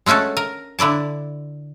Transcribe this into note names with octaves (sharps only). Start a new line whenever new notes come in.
G#3 A3 C#4 F#4 A4
A#4
D3 E4 D5 A5